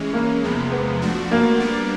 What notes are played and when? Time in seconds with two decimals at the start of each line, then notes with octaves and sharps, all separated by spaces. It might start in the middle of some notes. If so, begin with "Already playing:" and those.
Already playing: E3 G#3 C#4
0.13 A#3
0.43 E2 C3 F3 G#3 B3
0.72 B3
1.02 F3 A3 D4 F#4
1.31 A#3
1.60 G3 B3 D4